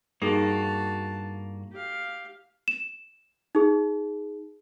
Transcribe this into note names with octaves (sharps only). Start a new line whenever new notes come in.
G2 A#3 D#4 F#4 G#4 A5
G4 F5
E7
D#4 G#4